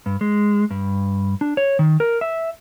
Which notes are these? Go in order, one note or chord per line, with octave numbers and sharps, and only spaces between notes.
G2
G#3
G2
D4
C#5
D#3
A#4
E5